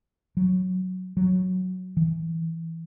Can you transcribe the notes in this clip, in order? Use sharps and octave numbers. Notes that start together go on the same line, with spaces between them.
F#3
F#3
E3